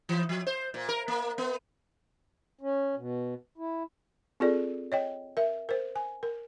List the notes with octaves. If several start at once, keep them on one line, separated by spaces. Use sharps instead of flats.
E3
F3
C5
A#2
A#4
A#3
B3
C#4
B2
E4
C4 F4 G#4 A4 D5
C#5 D#5 G5
A#4 E5
A#4 C5
G#5
A#4